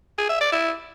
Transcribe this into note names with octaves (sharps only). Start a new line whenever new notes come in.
G#4
E5
D5
E4